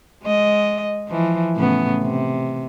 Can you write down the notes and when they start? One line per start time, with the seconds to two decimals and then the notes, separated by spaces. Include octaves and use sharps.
0.23 G#3 D#5
1.08 E3 F3
1.55 A2 C#3 B3
2.02 C3